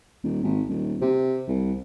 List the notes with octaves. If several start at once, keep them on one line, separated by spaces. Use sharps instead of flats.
D#1
G#1
D#1
C3
C2